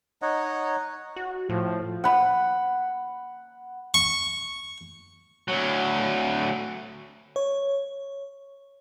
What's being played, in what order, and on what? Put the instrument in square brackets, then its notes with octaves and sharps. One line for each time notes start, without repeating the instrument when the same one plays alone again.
[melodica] D#4 C#5 D#5 F#5
[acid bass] F#4
[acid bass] A2 [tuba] F3
[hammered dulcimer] F#5 B5
[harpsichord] C#6
[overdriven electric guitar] D2 F#3
[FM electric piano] C#5